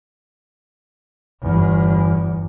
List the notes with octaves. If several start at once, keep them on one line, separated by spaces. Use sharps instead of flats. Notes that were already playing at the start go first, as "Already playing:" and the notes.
G1 E2